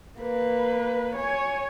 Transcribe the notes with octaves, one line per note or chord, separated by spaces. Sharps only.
A#3 B4
C#5 G#5